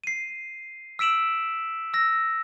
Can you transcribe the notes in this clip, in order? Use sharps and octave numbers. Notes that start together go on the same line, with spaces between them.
C7 D#7
E6 B6 D7 E7 F#7
E6 A#6